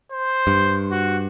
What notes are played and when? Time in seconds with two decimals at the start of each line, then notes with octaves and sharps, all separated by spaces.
0.12 C5
0.47 G2
0.91 F#4